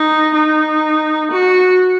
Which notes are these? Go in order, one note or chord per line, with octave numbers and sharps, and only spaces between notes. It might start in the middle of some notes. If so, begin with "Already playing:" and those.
Already playing: D#4
D#4
F#4